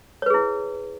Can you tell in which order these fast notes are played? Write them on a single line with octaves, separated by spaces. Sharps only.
C#5 B4 G#4 E4